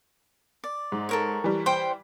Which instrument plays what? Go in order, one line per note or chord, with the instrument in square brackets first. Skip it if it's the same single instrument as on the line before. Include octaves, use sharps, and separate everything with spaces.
[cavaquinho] D5
[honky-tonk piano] G#2
[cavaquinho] A4 A#4 C#5
[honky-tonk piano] E3 G3
[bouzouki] C5 G5 [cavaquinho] C6